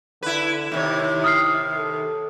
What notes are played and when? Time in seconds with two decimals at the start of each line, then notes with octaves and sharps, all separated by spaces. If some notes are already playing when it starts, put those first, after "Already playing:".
0.23 D3 E4 B4
0.72 D#2 C3 E4 C#5
1.24 D#6 F6 C7
1.77 A4